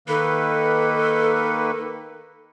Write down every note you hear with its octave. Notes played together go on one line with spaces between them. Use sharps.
D#3 A#3 A4 B4